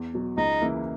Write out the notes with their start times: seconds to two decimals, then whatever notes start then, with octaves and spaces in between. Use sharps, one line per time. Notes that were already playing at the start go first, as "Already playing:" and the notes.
Already playing: E2
0.14 B2 F#3
0.37 C#2 D#4
0.61 C#3 E3 A#3 E4